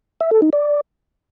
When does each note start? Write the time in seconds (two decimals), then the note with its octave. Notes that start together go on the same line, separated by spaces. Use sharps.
0.21 E5
0.31 A4
0.42 D#4
0.53 D5